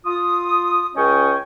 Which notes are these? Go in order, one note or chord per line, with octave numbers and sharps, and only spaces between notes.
F4 D#6
C#2 C#4 C#5 D#5 G5 C#6